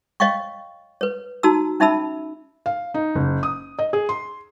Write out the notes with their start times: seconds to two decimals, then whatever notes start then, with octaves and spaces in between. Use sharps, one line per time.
0.20 C#5 D#5 F5 G5 C#6
1.01 B4 C#5
1.43 D#4 F#4 A5 A#5 E6
1.80 C#4 D#4 E5 A5 B5 E6
2.66 F5
2.94 D#4
3.15 F#1
3.43 D#6
3.79 D#5
3.93 G#4
4.09 C6